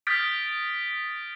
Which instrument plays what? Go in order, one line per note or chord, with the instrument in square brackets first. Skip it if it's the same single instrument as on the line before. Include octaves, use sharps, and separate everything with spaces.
[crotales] D#6 F6 G6 A6 B6 D7